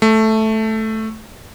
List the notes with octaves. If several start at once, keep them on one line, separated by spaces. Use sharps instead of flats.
A3